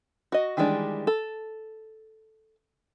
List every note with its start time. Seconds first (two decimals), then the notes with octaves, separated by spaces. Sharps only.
0.32 F#4 D#5
0.57 D#3 E3 G3 G#3 D4
1.07 A4